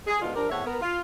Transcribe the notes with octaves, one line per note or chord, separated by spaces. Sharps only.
G#4
G#2 B2 D3 G#3 F4
F3 D4 G4 A#4
E2 A2 C4 C#5 E5 F#5
B3 A#4
F4